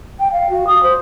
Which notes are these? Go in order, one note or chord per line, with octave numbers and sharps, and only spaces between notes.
G5
F5
F#4
D#6
C5